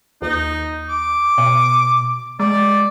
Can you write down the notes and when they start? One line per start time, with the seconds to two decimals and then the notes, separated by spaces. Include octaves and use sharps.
0.22 D#2 D#4
0.89 D6
1.38 B2
2.40 G#3 D5